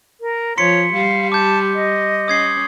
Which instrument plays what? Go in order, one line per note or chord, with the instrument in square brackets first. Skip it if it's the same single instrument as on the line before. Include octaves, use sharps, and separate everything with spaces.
[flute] A#4
[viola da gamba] F3 [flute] C#5 [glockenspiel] C6 B6 C#7
[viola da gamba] G3 [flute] F5
[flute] A5 [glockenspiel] D6 G6
[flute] D#5
[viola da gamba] C#4 [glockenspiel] D#6 G#6 C7